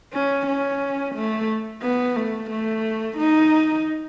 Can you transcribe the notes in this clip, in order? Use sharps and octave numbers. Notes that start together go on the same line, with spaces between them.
C#4
C#4
A3
B3
A3
A3
D#4